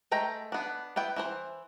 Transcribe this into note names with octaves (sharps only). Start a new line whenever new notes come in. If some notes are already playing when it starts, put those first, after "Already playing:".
G#3 A3 G5 A#5
B3 D4
B3 E4 G5
E3 E4 C5